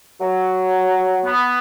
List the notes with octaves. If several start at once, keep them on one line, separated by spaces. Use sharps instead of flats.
F#3
B3